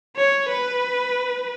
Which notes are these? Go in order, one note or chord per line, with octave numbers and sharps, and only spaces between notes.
C#5
B4